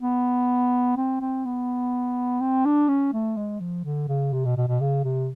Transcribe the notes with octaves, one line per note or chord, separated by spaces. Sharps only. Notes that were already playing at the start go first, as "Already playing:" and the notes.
B3
C4
C4
B3
C4
D4
C#4
A3
G#3
F3
D3
C#3
C3
B2
B2
B2
C#3
C3